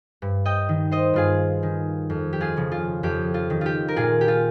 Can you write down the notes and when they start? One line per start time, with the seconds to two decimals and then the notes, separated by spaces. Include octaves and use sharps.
0.22 G2
0.45 D#5 G5
0.69 D#3
0.91 C5 D#5
1.14 G2 F4 G#4
1.63 D#3
2.10 F2
2.33 G4
2.40 F4 G#4
2.57 C#3 F3
2.72 F4
3.03 F2 G4
3.34 F4
3.50 D#3
3.61 F4 G4
3.88 A#4
3.96 A#2 F4 G#4
4.21 G4
4.28 F4